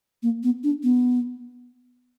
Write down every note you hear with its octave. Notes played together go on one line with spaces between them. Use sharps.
A#3
B3
D4
B3